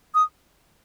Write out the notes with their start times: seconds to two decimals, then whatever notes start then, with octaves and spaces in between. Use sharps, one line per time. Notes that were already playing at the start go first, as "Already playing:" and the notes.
0.14 D#6